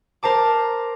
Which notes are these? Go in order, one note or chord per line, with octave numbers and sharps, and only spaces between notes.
A#4 C5 A5 D6